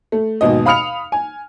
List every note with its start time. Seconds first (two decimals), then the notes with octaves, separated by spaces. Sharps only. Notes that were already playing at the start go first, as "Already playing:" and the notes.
0.12 A3
0.41 G#1 D#2 B2 D#5
0.66 F5 B5 D#6 F6 C#7 F7
1.12 G#5